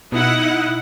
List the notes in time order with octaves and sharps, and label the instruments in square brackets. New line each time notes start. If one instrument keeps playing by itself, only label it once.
[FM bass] B2 [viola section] D#4 E4 F#5